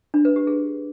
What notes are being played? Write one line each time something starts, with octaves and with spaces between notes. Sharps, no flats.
D4
B4
G4
G#4